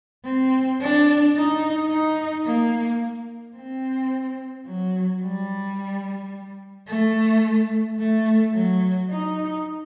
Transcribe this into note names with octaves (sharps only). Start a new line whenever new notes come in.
C4
D4
D#4
D#4
A#3
C4
F#3
G3
A3
A3
F#3
D#4